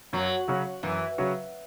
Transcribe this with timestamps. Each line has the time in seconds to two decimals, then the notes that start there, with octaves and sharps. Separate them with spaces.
0.13 F#2 F#3
0.48 C#3 F#3 C#4 F#4
0.83 F#2 E3
1.18 C#3 F#3 C#4 F#4